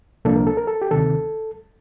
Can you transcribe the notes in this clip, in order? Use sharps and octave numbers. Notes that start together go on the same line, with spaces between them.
C2 A#2 F3 A#3 D4 A4
A#4
A4
A#4
A4
G4
D2 C3 D#3 A4